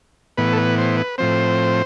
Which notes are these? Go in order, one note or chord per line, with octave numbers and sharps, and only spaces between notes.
A2 E3 B3 B4
A4
B4
C5
B4
A2 F3 C4 C5